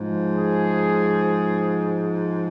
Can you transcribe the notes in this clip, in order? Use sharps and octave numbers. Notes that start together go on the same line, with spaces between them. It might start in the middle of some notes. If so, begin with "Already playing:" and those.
Already playing: G#2 F3 G#3
G#4